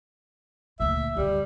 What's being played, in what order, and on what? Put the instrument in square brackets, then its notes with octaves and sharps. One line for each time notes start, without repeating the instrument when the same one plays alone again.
[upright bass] D2 A#2 [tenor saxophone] E5
[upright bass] F#2 D3 [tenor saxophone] G3